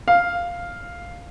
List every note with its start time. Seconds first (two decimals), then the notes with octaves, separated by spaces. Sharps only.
0.08 F5